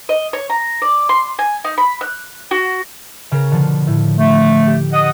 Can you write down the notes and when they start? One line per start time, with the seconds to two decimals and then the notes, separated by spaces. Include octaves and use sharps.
0.09 D#5
0.33 C#5
0.50 A#5
0.82 D5
1.09 C6
1.39 G#5
1.64 D#4
1.78 B5
2.01 F#6
2.51 F#4
3.31 C#3 A#4 A#6
3.51 B2 D3 F3
3.87 A2
4.17 A3
4.67 G4
4.93 D#5 F#5 D#6